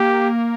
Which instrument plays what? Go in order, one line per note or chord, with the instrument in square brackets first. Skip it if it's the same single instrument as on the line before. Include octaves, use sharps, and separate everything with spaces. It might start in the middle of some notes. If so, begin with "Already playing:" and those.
Already playing: [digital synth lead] A#3 [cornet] G4